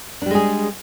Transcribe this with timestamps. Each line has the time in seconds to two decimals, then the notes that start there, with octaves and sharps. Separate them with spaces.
0.22 D4
0.26 G3
0.31 G#3
0.35 G#4